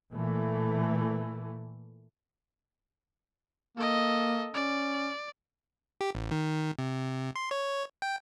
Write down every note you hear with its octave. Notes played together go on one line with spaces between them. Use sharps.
A#2 E3 A3
A#3 A4 D#5
C#4 D5
G4
A1
D#3
C3
C6
C#5
G5